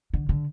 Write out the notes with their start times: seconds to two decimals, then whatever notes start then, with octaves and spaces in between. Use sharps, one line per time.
0.13 D3
0.29 D3